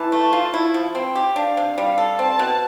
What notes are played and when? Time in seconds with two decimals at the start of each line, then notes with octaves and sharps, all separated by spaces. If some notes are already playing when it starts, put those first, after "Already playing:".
Already playing: E3 A5
0.12 A3
0.33 F4
0.54 E4
0.74 F3
0.95 C4 G5
1.15 G4
1.36 D4 F5
1.57 C3
1.77 G3 F5
1.98 A4
2.19 C4 A5
2.39 B2